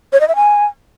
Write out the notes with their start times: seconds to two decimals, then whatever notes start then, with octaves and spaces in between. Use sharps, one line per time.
0.13 C#5
0.20 D#5
0.28 E5
0.36 G#5